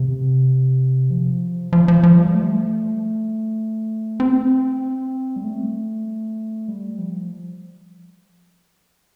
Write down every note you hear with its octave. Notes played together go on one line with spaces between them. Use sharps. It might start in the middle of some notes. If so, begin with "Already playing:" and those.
Already playing: C3
F3
F3
F3
F3
G3
A3
C4
G3
A3
G3
F3